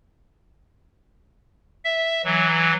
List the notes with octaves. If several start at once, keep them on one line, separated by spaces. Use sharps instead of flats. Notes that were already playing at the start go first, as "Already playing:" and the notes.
E5
E3 F#3